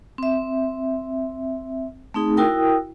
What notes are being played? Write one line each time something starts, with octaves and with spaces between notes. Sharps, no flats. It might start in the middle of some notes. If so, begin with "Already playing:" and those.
C4 E5
A3 C4 D#4 G#4
E4 F#4 A#4 G5 D#6